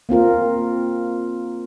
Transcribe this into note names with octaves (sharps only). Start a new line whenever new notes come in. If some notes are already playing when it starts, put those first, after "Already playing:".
A#3 C4 F4 A#4